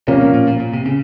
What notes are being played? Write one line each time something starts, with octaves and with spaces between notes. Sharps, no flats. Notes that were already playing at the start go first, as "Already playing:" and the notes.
C3 F3 A#3 C#4
A#2
A#2
A#2
A#2
C3
C#3